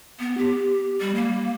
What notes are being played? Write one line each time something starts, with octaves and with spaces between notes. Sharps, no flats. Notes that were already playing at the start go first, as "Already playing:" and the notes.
B3
G4
G3
A#3